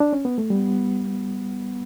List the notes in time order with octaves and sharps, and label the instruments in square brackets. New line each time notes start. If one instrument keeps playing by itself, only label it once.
[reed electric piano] D4
C#4
B3
A3
[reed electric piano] G3 [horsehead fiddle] B3
[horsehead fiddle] B3